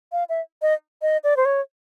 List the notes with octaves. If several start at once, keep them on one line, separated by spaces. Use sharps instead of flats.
F5
E5
D#5
D#5
D5
C5
C#5